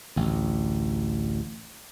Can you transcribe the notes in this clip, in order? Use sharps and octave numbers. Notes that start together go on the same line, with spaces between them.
A1 D2